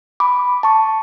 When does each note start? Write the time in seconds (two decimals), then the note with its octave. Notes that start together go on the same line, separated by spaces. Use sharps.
0.20 B5 D6
0.63 A5 C#6